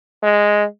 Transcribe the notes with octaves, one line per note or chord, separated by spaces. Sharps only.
G#3